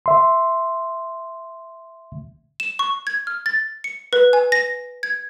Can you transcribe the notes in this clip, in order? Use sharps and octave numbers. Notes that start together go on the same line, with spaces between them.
E5 C6
E7
C#6
G#6
F6
A6
C#7
B4
G#5
A#6
G#6